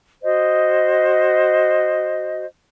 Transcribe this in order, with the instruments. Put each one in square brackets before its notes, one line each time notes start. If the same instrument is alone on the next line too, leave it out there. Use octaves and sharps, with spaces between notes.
[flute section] F#4 C5 D#5